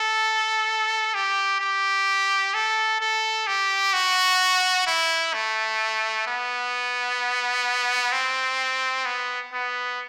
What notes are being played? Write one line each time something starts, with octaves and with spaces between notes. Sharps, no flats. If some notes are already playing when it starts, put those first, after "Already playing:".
Already playing: A4
G4
G4
A4
A4
G4
F#4
E4
A3
B3
C4
B3
B3